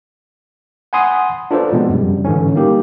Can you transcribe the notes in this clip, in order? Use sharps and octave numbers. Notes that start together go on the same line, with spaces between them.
F#5 G#5 B5 C6 D#6
D4 F4 A4 B4 C5 D5
B2 F3 G#3 B3 C4 D4
F#2 C#3 G3
G#2 D3 E3 C#4
G3 A#3 D#4 G4